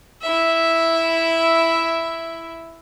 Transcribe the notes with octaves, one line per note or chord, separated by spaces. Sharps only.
E4 E5